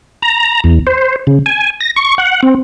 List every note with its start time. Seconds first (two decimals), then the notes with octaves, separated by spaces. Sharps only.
0.22 A#5
0.64 E2
0.87 C5
1.27 C#3
1.46 G#5
1.80 A#6
1.96 C#6
2.18 F#5
2.43 C4